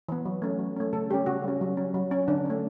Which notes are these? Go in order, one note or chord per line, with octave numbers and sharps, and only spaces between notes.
E3 B3
F#3
A3 C#4
F#3
A3 C#4
C#3 A4
G3 C#4 G4
C#3 F#4
G3 C#4
F#3
C#4
F#3
C#4
D3 D4
A3 C#4